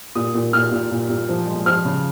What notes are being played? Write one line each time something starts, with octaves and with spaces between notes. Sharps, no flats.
A#2 D#6
A#2
A#2 F6
A#2
A#2
A#2
F3
G#3
F3 F6
C#3